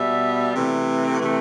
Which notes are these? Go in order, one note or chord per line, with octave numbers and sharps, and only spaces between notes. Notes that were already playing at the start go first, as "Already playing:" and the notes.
Already playing: B2 G3 E5
C3 E3 A3
C3 E3 A3